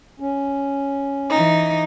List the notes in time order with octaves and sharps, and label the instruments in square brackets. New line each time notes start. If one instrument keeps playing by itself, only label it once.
[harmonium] C#4
[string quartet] E3 D#4